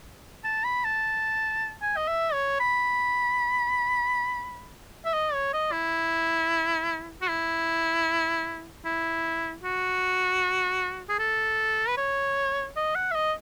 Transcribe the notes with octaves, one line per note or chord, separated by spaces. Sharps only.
A5
B5
A5
G#5
D#5
E5
C#5
B5
E5
D#5
C#5
D#5
E4
F#4
E4
E4
F#4
G#4
A4
B4
C#5
D#5
F#5
E5
D#5